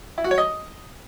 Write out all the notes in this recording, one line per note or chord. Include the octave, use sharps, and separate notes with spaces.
E4
F#4
C#5
D#5